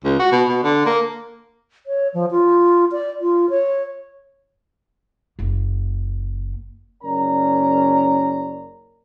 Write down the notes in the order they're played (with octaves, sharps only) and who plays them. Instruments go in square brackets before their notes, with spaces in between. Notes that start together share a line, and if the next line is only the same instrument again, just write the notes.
[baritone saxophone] C#2
F#4
B2
B2
D3
A#3
[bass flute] C#5
F3
F4
D5
F4
C#5
[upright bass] F#1 A#3
[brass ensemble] F#1 C#4 A#4 D5 A#5